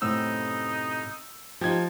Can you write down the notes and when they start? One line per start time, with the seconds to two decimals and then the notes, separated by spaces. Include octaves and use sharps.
0.02 F#2 A2 C3 D#4 E6
1.61 F3 D#4 G4 G#6